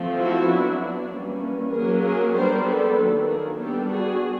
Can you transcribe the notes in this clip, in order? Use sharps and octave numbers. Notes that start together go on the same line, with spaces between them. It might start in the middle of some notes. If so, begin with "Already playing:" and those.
Already playing: F3 A3 C4
E4 F#4
F#3 B3 D4
E3 G3 A#3 C#4
F#3 A#3 C#4 G#4 A#4
G#4 A#4
G3 B3 D4 A#4 C5
A4 B4
D#3 F#3 A#3 D4
G#4 A#4
G3 B3 D4 G4 A4
F#4 G#4